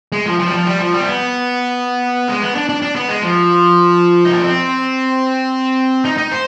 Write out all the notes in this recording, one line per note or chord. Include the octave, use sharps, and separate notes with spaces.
G#3
F3
F3
G3
F3
G3
F3
G3
C4
B3
G#3
B3
D4
D4
D4
B3
G#3
F3
D#4
D4
C4
D#4
D#4
C5